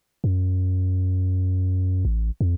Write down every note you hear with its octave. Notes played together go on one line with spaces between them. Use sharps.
F#2
A1
F2